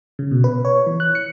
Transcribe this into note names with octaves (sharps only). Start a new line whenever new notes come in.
C#3
B2
B4
C#5
E3
F#6
C#7